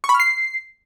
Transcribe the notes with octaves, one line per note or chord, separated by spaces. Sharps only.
C#6
B5
F6
C7